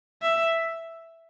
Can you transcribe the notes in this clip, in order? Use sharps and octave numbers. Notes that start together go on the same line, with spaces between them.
E5